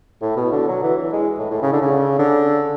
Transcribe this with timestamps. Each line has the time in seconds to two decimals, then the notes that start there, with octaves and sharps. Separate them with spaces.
0.22 A2
0.36 B2
0.52 D3
0.67 F#3
0.83 E3
0.97 E3
1.13 G#3
1.38 A2
1.51 A2
1.62 C#3
1.73 D3
1.82 C#3
2.19 D3